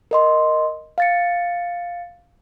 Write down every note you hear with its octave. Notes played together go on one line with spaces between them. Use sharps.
A#4 D#5 C6
F5 A6 C#7